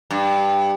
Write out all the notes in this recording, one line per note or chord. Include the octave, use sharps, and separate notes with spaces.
G2